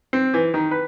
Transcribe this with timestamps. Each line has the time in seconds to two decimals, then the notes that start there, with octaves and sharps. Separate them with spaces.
0.13 C4
0.34 E3
0.54 D#3
0.71 B4